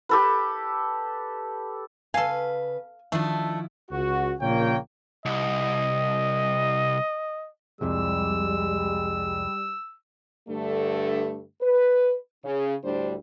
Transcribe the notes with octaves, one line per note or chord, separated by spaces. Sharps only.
G4 A4 B4
C#3 A4 B4 F5 G#5
D#3 F3 A3 D4 E4
C#2 F#4
A#1 A#2 C#3 A#3 C#5 G5
C2 D#5
C2 F2 C3 G3 G#3 E6
G2 D3 G3 A3
B4
C#3
D2 A2 G3 D4 C5